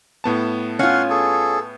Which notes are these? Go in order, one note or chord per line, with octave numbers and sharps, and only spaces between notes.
A2 B3 A5
C#4 F4 F5 F#5
G#4 A4